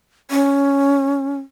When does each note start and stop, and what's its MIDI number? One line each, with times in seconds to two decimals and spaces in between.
0.31 1.38 61